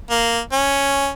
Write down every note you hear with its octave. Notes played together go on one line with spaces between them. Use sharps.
A#3
C#4